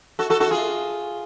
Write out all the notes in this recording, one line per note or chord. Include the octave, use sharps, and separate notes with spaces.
F#4 A4
F#4 A4
F#4 A4
F4 G#4